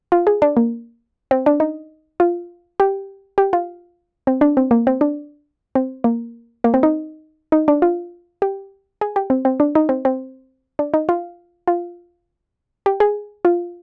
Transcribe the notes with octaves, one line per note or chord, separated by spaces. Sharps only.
F4
G#4
D4
A#3
C4
D4
D#4
F4
G4
G4
F4
C4
D4
C4
A#3
C4
D4
C4
A#3
A#3
C4
D#4
D#4
D4
F4
G4
G#4
G4
C4
C4
D4
D#4
C4
C4
D4
D#4
F4
F4
G4
G#4
F4